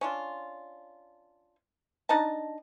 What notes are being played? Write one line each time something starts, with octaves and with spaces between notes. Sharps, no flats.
C#4 D4 F4
D4 D#4 D#5 A5